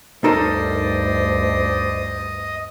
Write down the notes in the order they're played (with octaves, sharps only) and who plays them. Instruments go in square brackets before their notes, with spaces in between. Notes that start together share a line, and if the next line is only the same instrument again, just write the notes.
[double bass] D2 G2 [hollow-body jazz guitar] D#4 A4 A#4 [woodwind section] C5 D5 [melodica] D#5